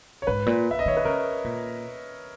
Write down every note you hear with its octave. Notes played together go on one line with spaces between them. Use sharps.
C#5
G#2 B4
A#2
E5
D#5
D#3 C#5
B4
C#3 A#4
A#2